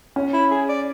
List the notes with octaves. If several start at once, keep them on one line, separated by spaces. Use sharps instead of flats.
C#4
E4
G#4
D5